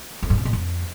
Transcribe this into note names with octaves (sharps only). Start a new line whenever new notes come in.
F2
G#2
C3
A#2
F2